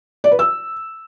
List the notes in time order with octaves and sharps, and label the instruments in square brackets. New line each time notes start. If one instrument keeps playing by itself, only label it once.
[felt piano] D5
B4
E6